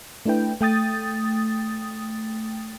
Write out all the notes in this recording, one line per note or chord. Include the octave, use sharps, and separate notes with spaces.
A3 D4 E4 B4 G5
A3 G5 D#6 A6